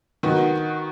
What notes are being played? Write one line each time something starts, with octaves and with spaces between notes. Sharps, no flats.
D#3 B3 F#4